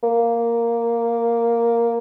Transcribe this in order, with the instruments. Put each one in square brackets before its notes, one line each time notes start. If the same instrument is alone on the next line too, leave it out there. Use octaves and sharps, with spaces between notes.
[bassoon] A#3